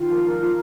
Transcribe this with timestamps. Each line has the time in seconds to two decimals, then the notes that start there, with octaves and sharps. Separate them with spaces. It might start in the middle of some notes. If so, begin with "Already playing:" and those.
Already playing: D#3 F4
0.08 F3 A#4
0.24 F3 A#4
0.40 F3 F4